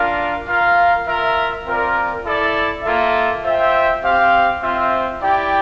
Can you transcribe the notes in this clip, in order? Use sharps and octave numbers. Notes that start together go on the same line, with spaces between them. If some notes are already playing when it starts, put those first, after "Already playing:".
Already playing: D4 F4 A#4 F5
F4 A#4 F5
F4 A#4 E5
C4 F4 A#4 D5
E4 A4 D5
A#3 F4 A4 E5
F4 C5 E5 G5
C4 G4 C5 F5
C4 F4 C5 E5
E4 G4 D5 G5